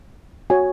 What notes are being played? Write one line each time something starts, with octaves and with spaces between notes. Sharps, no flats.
F#4 C#5 G#5